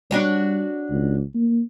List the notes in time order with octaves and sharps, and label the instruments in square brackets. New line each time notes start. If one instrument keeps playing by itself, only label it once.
[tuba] G3 [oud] D4 F#4 C#5
[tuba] C#2
A#3